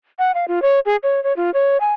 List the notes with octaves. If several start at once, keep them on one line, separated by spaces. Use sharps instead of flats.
F#5
F5
F4
C#5
G#4
C#5
C#5
F4
C#5
G#5